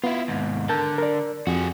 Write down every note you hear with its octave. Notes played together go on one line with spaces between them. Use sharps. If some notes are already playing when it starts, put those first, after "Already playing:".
B3 E4 F4
D#2 G#2
D3 A#4 A5 G6
A#4 D5
F2 F#4 G#4